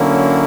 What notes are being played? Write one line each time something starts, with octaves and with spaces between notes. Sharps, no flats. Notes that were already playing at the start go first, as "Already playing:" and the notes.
Already playing: D3 F#3 A#3 C#4 E4